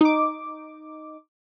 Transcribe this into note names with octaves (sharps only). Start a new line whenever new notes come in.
D#4 D6